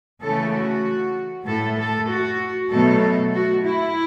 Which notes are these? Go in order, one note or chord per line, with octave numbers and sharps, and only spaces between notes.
C#3 E3 A3 A4
F#4
A2 A3 A4
A4
F#4
B2 F#3 A3 A4
F#4
E4